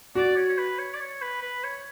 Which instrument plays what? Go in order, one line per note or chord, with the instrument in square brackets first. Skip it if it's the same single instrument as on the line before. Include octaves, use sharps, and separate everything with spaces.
[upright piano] F#4 [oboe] D5
[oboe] C#5
C#5
B4
C#5
D5
C#5
B4
B4
C#5